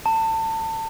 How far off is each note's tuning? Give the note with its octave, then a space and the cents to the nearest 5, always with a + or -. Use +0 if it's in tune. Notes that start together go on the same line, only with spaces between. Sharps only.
A5 +30